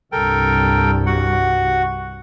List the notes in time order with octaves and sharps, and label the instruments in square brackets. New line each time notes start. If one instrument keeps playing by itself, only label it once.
[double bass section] C2 G2 [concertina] A4 A#4 G5
[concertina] F#4 F#5